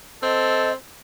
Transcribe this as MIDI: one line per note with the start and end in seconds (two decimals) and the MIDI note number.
0.23 0.74 60
0.23 0.72 69
0.23 0.72 75